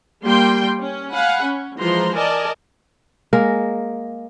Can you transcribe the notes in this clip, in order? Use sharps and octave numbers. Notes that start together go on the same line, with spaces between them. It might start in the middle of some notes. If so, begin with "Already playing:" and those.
G3 A#3 G5 C6
C#4
F5 F#5 G#5 B5
C#4
E3 F3 G#3 C5 A#5 C6
A#4 D5 D#5 G#5 A5
G#3 A#3 A#4